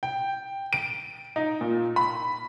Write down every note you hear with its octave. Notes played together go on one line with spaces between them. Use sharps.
G5
D7
D#4
A#2
B5